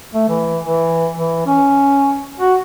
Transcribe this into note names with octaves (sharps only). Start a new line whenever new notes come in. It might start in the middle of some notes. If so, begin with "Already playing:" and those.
A3
E3
E3
E3
C#4
F#4